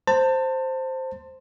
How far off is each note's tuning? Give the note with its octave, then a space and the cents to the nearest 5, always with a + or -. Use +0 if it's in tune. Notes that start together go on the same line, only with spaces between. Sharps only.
C5 +0 A5 +30